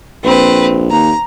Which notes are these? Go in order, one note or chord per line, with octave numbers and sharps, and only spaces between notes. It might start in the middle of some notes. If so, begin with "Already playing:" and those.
A#1 C4 B4
D#2 A#5